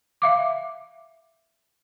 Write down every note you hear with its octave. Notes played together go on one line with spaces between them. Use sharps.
E5 F5 D6